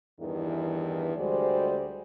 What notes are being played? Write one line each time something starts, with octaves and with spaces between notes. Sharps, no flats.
E2 G2 D#3 E3
D2 G3 G#3 F#4 C5 D5